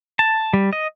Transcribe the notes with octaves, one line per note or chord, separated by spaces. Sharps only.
A5
G3
D#5